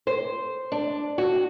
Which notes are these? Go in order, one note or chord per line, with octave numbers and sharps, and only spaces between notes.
C5
D4
F#4